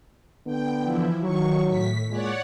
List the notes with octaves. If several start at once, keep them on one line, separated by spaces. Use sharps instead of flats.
D3 B3 G5
E3 F3 E4
D#3 F#3 C#6
A2 B6
A#2 G#3 C#5 D5 F#5